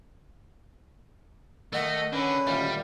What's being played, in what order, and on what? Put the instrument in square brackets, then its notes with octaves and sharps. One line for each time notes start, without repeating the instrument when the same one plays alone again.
[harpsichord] D#3 F#5 A#5 [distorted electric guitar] A3 [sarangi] D#5
[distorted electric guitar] D3 [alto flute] C#4 [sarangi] B4
[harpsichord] D2 A#2 D#3 [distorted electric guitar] G3